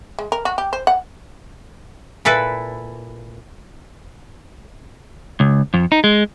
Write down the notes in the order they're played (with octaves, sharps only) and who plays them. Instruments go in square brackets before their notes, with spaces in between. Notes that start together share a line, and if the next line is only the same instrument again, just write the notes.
[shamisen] G#3
A#4
F#4
G4
C5
F#5
[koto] A#2 E4 A4 B4
[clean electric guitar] C#2
F2
D#4
G#3